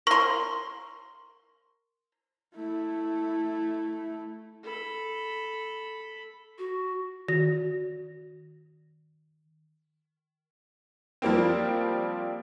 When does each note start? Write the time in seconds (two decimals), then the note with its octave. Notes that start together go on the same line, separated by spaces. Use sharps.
0.07 A#4 C6 C#6
2.55 A3 E4
4.64 A4 B5
6.58 F#4
7.28 D#3 F#4 A#6
11.22 F3 G3 A#3 C4